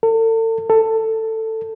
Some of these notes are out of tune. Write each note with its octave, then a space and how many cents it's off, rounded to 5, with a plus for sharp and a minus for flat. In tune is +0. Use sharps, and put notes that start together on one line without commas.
A4 +40
A4 +15